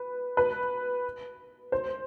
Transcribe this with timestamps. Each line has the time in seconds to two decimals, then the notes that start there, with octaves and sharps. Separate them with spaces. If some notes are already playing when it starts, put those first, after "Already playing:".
Already playing: B4
0.37 B4
1.72 C5